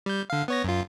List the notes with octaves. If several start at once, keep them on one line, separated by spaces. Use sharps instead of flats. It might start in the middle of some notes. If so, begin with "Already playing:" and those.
G3 G6
D3 F5
B3 C#5 A#6
F#2 F4